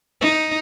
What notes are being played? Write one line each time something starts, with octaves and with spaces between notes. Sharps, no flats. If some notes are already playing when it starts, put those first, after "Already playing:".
D#4